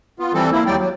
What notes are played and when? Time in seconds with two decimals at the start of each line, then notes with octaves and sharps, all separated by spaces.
0.19 B3 F4
0.34 E3 G3 C4 A4
0.52 A#3 E4
0.66 D#2 F#3 G3 D5 G5
0.79 F#3